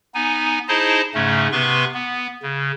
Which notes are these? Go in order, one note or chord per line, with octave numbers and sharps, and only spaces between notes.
B3 D#4 G#5
D#4 E4 G#4 C5 D#5 A5
G#2 C#3 A3 C#4
C3 B3 B4 C6 C#6
B3
C#3